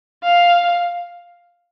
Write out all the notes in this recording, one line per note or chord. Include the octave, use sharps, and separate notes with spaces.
F5